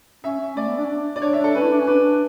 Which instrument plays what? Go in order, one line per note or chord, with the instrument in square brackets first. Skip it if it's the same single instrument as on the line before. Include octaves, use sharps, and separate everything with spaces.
[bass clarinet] C#4 [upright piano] E5
[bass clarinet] C#4
[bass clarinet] A3 [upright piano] D5
[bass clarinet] B3
D4
C#4
D4
[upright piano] D5
[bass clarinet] D4 [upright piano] C#5
[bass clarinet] D4 [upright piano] E5
[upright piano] A4
[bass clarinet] C#4 [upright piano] B4
[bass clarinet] E4
D4
C#4
[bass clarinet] D4 [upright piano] B4